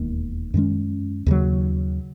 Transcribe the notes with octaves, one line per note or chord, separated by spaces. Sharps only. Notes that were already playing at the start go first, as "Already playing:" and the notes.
Already playing: E1 D#2 D#3 A#3
F#2 D#3 G#3 C#4
D#2 C#3 F#3